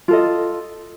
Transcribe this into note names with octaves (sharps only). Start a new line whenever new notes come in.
F4 A4 D#5